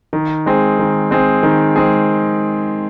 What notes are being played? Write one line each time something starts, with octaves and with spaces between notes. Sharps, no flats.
D#3
G#3 C4 G#4
D#3
G#3 C4 G#4
D#3
G#3 C4 G#4